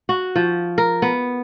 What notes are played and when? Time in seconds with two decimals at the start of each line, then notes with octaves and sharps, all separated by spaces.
0.09 F#4
0.36 F3
0.78 A#4
1.02 B3